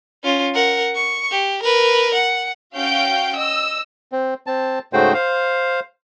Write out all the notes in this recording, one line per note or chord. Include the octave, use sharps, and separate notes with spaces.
C#4 F4
A#4 F#5
C#6
G4
A#4 B4
F#5
C#4 F#4 F5 G5 G6 D7
D#5 E6
C4
C4 A5
G#2 C#3 A3 F#4 C5 G5
C5 F5